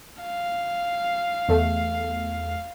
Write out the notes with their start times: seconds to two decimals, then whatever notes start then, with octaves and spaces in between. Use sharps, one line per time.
0.23 F5
1.48 E2 A3